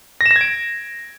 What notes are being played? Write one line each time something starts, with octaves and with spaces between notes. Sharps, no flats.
A#6
E7
A#6
G#6
D7